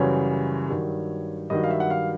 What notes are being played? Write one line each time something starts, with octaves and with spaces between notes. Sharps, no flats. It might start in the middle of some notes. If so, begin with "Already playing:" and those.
Already playing: F#2 C#3 E3 G3 C#5
G2 D#3 F#3
G2 D#3 F#3 D#5
F5
E5
F#5
F5